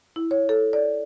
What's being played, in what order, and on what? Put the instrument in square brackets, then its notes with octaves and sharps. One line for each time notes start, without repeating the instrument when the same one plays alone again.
[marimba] E4
C#5
A4
D5